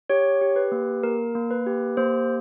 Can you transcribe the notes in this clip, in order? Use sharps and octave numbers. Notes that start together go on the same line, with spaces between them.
G4 C#5
G4
B4
A#3
A#3 A#4
A#3
B4
G4
A#3 C5